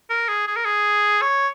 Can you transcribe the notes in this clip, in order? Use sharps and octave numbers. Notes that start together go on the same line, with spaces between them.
A#4
G#4
G#4
A#4
G#4
C#5